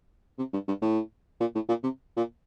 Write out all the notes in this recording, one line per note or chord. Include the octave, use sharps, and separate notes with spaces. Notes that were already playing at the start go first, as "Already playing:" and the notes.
C3
G2
G2
A2
A#2
A2
A#2
C3
A#2